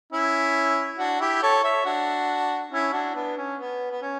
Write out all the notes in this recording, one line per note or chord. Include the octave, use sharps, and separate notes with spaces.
C#4 E4
D4 F#4
E4 G4
A4 C#5
C#5 E5
D4 F#4
C#4 E4
D4 F#4
B3 D4
C#4
B3
B3
C#4